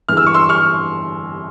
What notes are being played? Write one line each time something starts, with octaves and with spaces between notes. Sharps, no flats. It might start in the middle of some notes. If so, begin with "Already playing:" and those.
G2 E3 G#3 F6
E6
C#6
C6 E6
C#6 F6